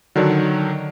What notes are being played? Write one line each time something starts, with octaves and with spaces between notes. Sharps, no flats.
D3 D#3 F#3 D4